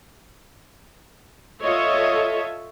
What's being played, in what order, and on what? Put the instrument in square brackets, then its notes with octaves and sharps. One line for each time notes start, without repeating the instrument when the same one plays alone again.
[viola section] F4 A4 C#5 D#5 E5